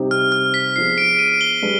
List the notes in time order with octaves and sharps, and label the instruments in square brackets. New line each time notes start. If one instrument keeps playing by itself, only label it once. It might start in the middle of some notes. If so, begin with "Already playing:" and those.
Already playing: [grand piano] C3 G3 C4 D#4 G4
[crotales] F6
F6
B6
[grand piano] F3 B3 D4 F4 G#4 [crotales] C7
[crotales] D7
D#7
G7
[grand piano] G3 D4 G#4 B4